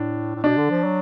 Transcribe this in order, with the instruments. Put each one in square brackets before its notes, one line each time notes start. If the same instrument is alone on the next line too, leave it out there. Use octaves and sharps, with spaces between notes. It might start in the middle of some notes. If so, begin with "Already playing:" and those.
Already playing: [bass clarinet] A2 [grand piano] D4
[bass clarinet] A2
[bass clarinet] B2 [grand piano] D4
[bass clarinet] D3
F3
F#3